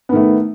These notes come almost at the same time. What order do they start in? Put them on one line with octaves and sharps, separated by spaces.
B3 D#3 A3